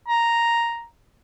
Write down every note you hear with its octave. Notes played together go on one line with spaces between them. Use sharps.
A#5